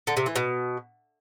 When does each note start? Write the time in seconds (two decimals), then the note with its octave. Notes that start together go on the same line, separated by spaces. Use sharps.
0.07 D3
0.17 C3
0.26 E3
0.36 B2